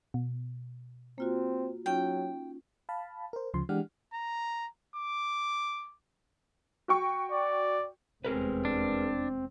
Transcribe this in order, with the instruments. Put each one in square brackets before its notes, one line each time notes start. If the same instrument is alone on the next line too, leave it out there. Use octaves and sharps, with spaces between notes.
[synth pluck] B2
[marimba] A#3 F4 F#4 [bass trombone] C4
[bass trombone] F#3 [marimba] C#4 D#4 F4 [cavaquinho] G5
[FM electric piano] F5 A5 B5
A#4 C5
D2 C#3 F3 C6
E3 G#3 D4 G4 F#5 F6
[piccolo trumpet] A#5
D6
[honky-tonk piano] F#4 G5 C#6
[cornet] D5
[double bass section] F1 E2 G#3 [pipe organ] C4 [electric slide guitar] G#4 A#4 B4
[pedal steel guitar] D4